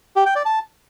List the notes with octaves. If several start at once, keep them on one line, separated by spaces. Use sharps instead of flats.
G4
G5
D5
A5